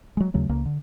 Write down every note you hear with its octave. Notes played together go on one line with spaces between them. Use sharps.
F#3 G#3
D#2 C#3 F#3 A3
C#2 C#3 A#3
D3